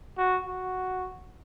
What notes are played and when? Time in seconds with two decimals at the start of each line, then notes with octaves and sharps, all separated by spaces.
0.18 F#4
0.47 F#4